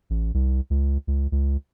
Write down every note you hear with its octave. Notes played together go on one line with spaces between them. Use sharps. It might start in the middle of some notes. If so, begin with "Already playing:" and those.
A1
C2
C#2
C#2
C#2